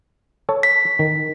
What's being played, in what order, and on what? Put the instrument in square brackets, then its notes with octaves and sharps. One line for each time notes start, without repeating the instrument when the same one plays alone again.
[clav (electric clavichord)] A4 C#5 A5
[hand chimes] B6
[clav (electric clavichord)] D#3